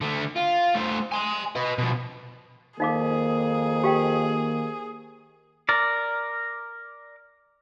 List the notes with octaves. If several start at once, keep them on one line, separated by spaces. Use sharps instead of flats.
D3 A3
F4
A3 C5
G#5 C6
B4 D#5
B2 F3
F2 D#3 A#3 D#4 G#4 F5 D6
G4 F5 G5
A#4 D5